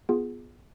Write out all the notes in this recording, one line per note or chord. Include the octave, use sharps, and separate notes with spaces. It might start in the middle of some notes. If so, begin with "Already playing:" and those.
B3 F4 G#4